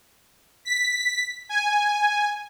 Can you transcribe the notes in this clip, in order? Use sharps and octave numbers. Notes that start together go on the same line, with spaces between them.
B6
G#5